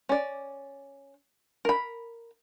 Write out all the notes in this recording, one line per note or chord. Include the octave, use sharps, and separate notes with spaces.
C#4 D5
A#4 B5